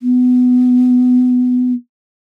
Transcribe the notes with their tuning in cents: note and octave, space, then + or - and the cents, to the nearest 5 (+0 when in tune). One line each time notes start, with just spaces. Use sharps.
B3 +20